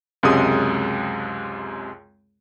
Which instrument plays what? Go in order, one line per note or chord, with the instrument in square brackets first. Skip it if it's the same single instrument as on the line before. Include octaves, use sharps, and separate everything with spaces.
[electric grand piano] C#2 F#2 C3 G#3 D#6